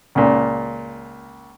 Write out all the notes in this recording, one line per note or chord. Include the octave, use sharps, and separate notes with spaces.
C#2 A#2